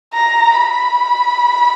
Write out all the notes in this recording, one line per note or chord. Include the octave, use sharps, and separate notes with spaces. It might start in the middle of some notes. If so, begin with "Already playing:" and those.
A#5
B5